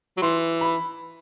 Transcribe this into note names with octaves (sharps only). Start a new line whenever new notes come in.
F#3
E3 C6
B5